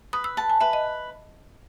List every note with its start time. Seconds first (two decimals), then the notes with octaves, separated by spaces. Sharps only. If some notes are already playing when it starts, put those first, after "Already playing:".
0.13 B4 D#6
0.24 E6
0.37 A5
0.50 G#5
0.61 B4 E5
0.73 D#5